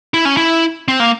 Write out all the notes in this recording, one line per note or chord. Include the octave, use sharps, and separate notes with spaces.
E4
C#4
E4
C4
A#3